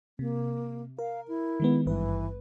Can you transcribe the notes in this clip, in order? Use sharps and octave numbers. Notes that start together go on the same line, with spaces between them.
C3 A#3
A#4 F5
E4
D#3 G#3 B3
G#1 G2 E3 B4